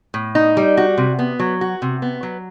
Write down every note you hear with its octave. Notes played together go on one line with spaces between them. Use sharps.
A2
D#4
G3
F#4
C3
B3
F#3
F#4
C3
B3
F#3